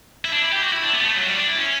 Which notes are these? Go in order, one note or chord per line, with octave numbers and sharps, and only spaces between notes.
E4
D4
E4
G4
F#4
E4
D4
B3
G3
A3
F#3
G3
D4
E4
C#4